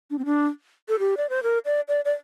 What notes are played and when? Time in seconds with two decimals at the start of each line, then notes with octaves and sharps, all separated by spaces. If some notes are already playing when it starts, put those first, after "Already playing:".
0.11 D4
0.18 C4
0.25 D4
0.89 A4
0.99 G4
1.17 D5
1.30 C5
1.43 A#4
1.65 D5
1.88 D5
2.05 D5